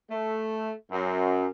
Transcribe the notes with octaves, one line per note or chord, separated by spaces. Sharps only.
A3
F#2